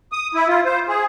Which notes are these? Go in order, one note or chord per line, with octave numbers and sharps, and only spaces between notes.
D#6
E4
F4
C5
G#4